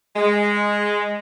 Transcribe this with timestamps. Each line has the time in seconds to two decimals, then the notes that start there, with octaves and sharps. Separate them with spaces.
0.16 G#3